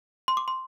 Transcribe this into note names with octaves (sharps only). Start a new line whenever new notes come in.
C6
D6
C6